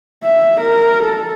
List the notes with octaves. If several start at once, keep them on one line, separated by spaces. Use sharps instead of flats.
E5
A#4
A4